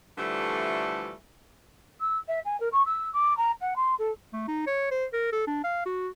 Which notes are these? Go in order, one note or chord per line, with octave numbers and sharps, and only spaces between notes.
D3 E3 F3 G3 A3
E6
E5
G#5
A#4
C#6
E6
D6
A#5
F#5
C6
A4
A3
D#4
C#5
C5
A#4
A4
D4
F5
F#4